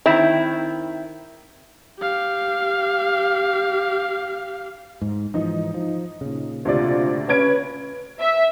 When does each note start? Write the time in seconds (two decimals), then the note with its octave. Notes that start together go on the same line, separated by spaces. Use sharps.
0.06 D#3 C4 E4 E5
2.00 G4 F5
5.02 G#2
5.34 G#2 E3 F3 D#4
5.74 F3
6.21 A#2 C#3
6.65 D2 C3 F4 D5
7.29 C#4 B4 G#6 D7
8.20 E5